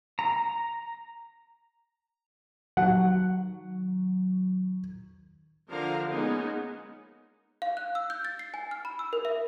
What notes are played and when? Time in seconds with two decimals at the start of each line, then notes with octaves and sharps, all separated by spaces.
0.19 A#5
2.77 D#3 F#3 F#5
5.70 D3 F3 A#4 F5 A#5
6.09 G#3 A#3 B3 C#4 D#4
7.62 F5
7.77 F#6
7.95 E6
8.10 G6
8.25 A6
8.39 C7
8.54 G#5
8.71 F6
8.85 B5
8.99 E6
9.13 A#4
9.25 E5